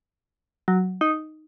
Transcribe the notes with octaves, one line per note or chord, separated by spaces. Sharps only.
F#3
D#4